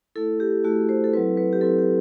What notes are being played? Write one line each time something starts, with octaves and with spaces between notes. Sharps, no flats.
A3 E4 A4
G4
A3 E4 F#4
C5
A4
F#3 C4 E4 B4
B4
G4
F#3 C4 E4 A4
G4